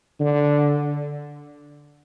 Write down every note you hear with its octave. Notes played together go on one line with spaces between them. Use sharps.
D3